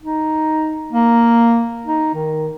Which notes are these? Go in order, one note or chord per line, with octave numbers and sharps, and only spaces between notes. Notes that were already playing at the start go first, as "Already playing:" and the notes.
D#4
A#3
D#4
D#3